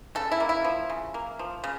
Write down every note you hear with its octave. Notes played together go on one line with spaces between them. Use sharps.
C#3 A4
E4
A#3
E4
F3
C#3
A#3
F3
C#3